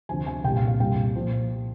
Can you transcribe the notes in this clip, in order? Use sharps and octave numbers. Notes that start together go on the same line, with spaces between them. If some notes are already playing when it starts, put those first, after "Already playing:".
D2 C3 F3 G#5
G#5
C2 A#2 G3 G5
F5
F5
C2 A#2 G3 G5
A#2 F3